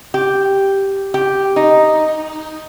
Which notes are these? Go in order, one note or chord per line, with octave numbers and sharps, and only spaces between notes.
G4
G4
D#4